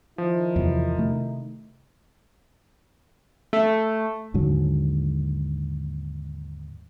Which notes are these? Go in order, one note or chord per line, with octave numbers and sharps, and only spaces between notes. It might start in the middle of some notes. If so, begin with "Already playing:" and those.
D#3 F3 D#4 E4
E2 C3 F#3
C3 A3
A3
D#2 G#2 D3 F#3